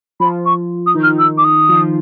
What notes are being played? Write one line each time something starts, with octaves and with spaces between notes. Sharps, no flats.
F3 F4 B5
C#6
D#6
D#3 D#4
F6
E6
D6
D#6
F3 F4